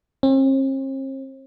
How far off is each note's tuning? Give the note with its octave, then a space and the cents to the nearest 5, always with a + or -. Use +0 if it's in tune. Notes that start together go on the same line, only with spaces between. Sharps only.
C4 +45